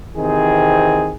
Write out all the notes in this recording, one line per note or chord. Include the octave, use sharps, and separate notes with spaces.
C3 D#3 E3 C4 G#4